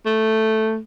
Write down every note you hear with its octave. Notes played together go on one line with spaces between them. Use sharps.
A3